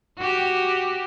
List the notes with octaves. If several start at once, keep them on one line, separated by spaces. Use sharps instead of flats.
F#4 G4